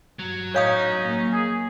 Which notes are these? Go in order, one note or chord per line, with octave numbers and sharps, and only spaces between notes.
G2 F#3
A2 C#4 D#4 C#5 F5 D#6
A#3
G#4